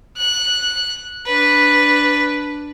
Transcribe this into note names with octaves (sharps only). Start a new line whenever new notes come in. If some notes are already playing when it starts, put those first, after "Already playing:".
F#6
D4 B4